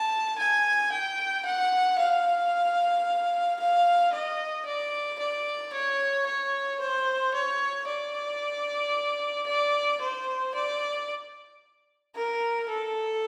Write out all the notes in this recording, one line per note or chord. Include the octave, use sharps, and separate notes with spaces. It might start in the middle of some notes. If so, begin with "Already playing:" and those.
Already playing: A5
G#5
G5
F#5
F5
F5
D#5
D5
D5
C#5
C#5
C5
C#5
D5
D5
C5
D5
A#4
A4